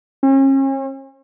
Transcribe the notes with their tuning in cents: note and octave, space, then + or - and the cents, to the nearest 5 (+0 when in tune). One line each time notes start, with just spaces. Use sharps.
C#4 -40